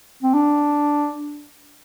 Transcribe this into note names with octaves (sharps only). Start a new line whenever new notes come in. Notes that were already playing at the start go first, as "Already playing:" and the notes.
C4
D4